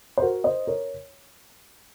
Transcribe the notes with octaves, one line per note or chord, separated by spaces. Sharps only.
C5
F#4 A#4
C5 D#5
A#4 C#5